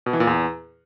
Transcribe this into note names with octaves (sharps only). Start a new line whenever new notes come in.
B2
E3
A#2
E2